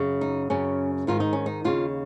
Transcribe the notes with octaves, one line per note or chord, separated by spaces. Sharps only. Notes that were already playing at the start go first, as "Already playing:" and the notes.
Already playing: F#2 C#3
D#4
F#2 C#3 C#4
G#2 D#3 F4
D#4
C#4
D#4
D#2 C#3 F4